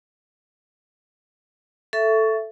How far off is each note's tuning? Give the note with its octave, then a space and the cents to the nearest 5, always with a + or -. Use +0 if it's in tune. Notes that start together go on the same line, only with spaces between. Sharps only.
A4 +0 E5 +10 C#6 +20